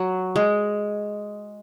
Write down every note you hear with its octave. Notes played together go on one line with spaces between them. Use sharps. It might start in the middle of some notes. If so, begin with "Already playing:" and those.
Already playing: F#3
G#3